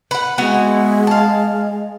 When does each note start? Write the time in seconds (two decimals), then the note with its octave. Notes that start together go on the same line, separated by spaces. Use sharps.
0.11 B4 F#5
0.38 G#3 B3 E4 F#4
1.07 F5 A5